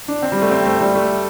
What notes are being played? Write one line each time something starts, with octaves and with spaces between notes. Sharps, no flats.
D4
C4
G3
A3
C4
A3
G3
A3